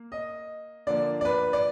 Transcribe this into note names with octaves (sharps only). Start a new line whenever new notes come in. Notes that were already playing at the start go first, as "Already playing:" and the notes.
Already playing: A#3
D#5
D3 F3 A#3 D5
D5
B4
D5